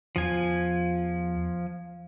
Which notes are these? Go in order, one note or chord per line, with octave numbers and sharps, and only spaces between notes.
E2 F3 G#5